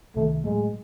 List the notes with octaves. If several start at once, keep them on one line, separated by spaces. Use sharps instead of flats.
C2 C3 D#3 A3
A2 F#3 G#3 A3